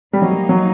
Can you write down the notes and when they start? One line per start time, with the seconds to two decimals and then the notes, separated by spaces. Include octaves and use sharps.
0.13 F3 G3 A#3 D#4
0.22 F#3
0.31 G3
0.49 F#3